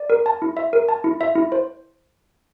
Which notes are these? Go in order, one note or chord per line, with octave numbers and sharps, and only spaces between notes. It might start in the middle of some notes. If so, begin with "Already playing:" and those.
Already playing: D5
A#4
A5
E4
E5
A#4
A5
E4
E5
E4
C5